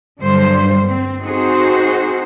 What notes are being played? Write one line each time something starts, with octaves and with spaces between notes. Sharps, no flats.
G2 D3 F#3 G3 C5
C4
C4 D#4 F#4 G#4 C5